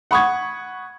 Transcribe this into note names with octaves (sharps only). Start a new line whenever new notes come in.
F#5 B5 C#6 D#6 G#6